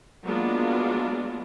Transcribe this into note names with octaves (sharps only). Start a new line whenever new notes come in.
F#3 G#3 A#3 B3 D4 F4